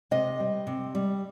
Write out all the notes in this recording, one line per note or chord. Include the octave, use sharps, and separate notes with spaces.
C3 D#5
G3
C3
G3